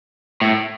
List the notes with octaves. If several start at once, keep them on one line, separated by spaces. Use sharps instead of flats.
A2